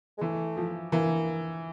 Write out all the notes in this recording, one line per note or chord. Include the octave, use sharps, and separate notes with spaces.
G#3
E3 A3
F3
E3 A#3